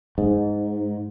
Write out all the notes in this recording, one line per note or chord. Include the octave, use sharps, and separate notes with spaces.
G#2